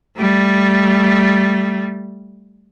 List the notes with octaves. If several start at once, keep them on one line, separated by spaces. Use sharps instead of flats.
G3 A3